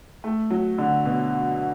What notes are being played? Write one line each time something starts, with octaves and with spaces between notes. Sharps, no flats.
A3
F#3
D3
B2